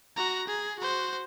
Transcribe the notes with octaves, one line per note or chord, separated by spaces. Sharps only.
F#4 A#5
G#4
F#4 C5